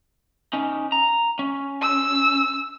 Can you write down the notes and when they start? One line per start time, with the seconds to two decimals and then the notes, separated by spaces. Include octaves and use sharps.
0.53 C#4 D#4
0.92 A#5
1.39 C#4
1.82 E6